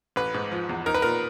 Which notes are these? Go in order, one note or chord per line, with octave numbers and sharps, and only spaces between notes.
A1 B4
G#2
F3
E2
D#4 A#4
B4
A#2 A#4